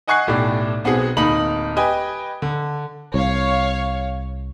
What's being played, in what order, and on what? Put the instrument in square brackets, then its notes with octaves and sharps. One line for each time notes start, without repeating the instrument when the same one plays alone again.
[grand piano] D#5 F#5 G#5 C#6 F#6 C7
B1 A2 G4 D5
B1 B3 C4 F#4 G#4
D1 A#3 D#4 B5 F#7
G4 B4 D#5 G5 G#5
D3
[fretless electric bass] C2 [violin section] C#5 F5